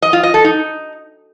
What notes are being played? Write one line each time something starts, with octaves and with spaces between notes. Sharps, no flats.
D#5
F4
D#5
A4
D#4